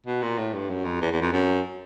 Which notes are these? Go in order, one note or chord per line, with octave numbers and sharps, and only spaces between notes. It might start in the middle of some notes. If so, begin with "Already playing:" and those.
B2
A#2
A2
G2
F#2
F2
E2
E2
F2
F#2